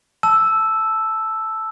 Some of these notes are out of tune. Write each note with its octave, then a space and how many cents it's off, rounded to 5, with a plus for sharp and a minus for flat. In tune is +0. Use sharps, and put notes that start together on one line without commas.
A5 -5 E6 +0